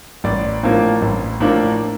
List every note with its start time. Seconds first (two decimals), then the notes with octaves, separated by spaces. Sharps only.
0.24 A1 D5
0.63 A2 F3 A#3 D4
1.02 A1
1.40 A2 F3 A#3 D4